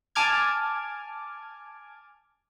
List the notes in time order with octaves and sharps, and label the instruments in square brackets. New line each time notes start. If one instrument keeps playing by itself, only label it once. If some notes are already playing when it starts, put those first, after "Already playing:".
[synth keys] G#5 A5 D6 F6 G#6